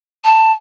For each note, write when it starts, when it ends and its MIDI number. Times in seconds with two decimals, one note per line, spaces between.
0.24 0.51 81